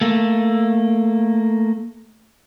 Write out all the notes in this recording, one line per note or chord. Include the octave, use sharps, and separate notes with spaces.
A3 A#3